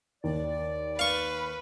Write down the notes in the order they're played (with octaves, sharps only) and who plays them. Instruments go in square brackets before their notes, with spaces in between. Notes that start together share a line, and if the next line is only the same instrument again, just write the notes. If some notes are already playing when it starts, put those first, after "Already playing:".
[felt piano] D#2 [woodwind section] D5
[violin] B4 [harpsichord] F5 C#6